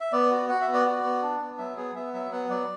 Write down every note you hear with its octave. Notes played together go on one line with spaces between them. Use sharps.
E5
B3 D5
F#4
F#4 F#5
E5
B3
D5
F#4
B3
D4
B3
F#3 E5
B3 G#4
B3 E5
F#3 E5
B3 F#5
F#3 D5